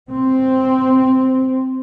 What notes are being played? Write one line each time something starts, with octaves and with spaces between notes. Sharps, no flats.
C4